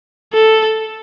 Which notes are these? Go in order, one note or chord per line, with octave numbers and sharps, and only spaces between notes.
A4